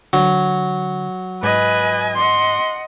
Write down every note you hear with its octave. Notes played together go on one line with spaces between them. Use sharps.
D3 F#3
G#2 B4 D#5 G#5
D#5 F#5 C6